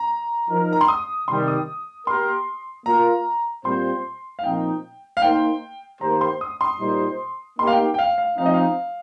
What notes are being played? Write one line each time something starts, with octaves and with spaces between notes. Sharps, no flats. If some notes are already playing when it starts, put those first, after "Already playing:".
Already playing: A#5
F3 D#4 A#4
A#5
C6
D#6
C3 D#3 G3 C6
D#6
A#3 G4 A#4 C6
A#3 F4 A#4 A#5
A#2 G3 C4 F4 C5 C6
F5
A#2 F3 C4 D#4 G5
F5
A#3 D#4 C5 G5
D#3 A#3 G4 C5 A#5
C6
D#6
C6
A#2 G3 D#4 C5
A#3 D#4 G4 C6
F5
G5
G5
F5
F5
F3 C4 D#4 F5
D#5
F5